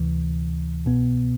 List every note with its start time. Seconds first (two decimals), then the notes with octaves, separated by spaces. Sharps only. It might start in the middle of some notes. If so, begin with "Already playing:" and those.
Already playing: D2 C3 E3
0.85 C2 B2 B3